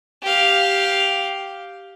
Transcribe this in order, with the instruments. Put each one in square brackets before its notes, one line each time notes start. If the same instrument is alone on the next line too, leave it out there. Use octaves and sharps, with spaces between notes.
[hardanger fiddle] G4 F5